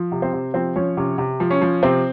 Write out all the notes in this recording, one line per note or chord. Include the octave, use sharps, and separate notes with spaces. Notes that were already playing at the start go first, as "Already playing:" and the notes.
Already playing: F3
C3
C4 C5
C3
F3 C4 C5
F3 C#4 C#5
C3 C#4 C#5
C3
F3
C#4 C#5
F3
C3 C4 C5